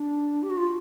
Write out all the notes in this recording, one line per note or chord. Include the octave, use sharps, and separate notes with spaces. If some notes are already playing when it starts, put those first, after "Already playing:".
Already playing: D4
G4
F#4
F4